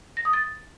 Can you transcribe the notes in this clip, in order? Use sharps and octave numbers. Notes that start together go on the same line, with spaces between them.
A#6
D#6
A6